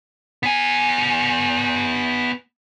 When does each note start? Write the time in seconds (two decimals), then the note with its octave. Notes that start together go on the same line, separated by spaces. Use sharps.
0.43 B3 G#5